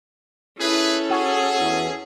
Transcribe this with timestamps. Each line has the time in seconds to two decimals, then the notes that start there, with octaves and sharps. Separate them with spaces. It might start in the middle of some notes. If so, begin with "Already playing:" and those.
0.59 C#4 E4 G#4 A4 B4
1.10 F#4 G#4
1.58 E2 E3